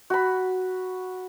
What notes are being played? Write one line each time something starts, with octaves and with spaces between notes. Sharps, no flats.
F#4 B5